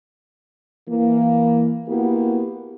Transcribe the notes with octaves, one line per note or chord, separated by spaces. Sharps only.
E3 A#3
A#3 B3 E4 F#4 G4